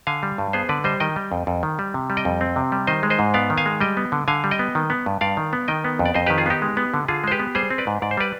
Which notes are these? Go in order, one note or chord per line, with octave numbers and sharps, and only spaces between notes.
D3 F5 G#5
G3
G2
B3 G#4 C5
D3 B4 D5
G3 C5 D#5
D#3 D#5 G5
G3
F2
F2
D#3
G3
C3
G3
D#5 G5
F2
C4
C3
G3
D#3 C5 D#5
G#3
C5 D#5
G#2
B3 D5 F5
D#3
F5 G#5
G#3
G3 D#5 G5
B3
D3
D3 F5 G#5
G3
D#5 G5
B3
D#3
B3
G2
G2 D5 F5
D#3
B3
D#3 D#5 G5
B3
F2
D5
F2 C5 D#5
D#3 G4 B4
F4 G#4
B3 D#4 G4
G#3
B3
D3
D3 F4 G#4
G#3 C5
G4 B4
B3
G3 G#4 C5
C4
B4 D5
G#2
G#2 D5
C5
G3 B4 D5